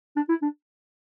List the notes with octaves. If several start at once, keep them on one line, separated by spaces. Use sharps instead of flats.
D4
E4
D4